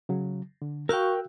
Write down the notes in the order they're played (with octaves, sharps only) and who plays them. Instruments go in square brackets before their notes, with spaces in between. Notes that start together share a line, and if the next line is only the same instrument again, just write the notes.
[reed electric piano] C#3 F#3
D3
[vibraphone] F#4 F5 C#6 [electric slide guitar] A#4 G5 [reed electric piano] E6 F#6 G6